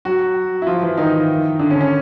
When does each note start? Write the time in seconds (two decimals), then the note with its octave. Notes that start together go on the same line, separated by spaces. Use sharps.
0.05 F#3 F#4
0.62 E4
0.67 F3 F4
0.82 E3 E4
0.97 D#3 D#4
1.59 D3 D4
1.71 C#4
1.81 C#4